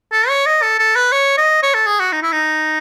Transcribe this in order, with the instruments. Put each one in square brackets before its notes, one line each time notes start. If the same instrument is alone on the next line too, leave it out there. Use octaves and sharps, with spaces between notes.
[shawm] A4
C#5
D#5
A4
A4
B4
C#5
D#5
C#5
A4
G#4
F#4
D#4
E4
D#4